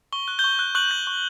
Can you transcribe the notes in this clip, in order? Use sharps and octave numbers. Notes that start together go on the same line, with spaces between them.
C#6 G7
F#6
G6 G7
C#6
F#6
C#6 F#6 F#7
G6
C#6